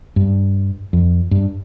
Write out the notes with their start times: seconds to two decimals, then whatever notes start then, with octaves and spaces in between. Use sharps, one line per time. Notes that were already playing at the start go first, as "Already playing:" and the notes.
0.16 G2
0.93 F2
1.31 G2